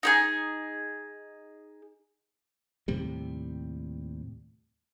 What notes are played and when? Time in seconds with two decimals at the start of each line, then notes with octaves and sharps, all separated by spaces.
0.03 D#4 G4 G#4
2.88 D#2 A2 C3 G3